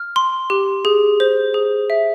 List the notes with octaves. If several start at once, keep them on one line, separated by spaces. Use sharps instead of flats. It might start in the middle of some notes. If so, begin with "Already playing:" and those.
Already playing: F6
C6
G4
G#4
C5
G#4
E5